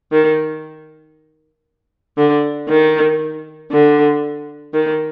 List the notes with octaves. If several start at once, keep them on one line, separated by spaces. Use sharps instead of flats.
D#3
D3
D#3
D3
D#3